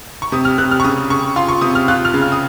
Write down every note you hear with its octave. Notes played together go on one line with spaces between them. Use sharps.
C#6
C3 D#6
F6
C3 F#6
F6
C#6
C#3 D#6
C#3 C#6
F4 C6
C#6
C3 D#6
F6
F4 F#6
F6
C#3
F6
D#6